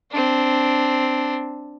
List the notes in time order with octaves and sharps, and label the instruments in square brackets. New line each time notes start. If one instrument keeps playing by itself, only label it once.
[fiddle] C4 D4